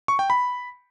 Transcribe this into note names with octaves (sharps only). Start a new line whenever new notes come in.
C#6
G5
B5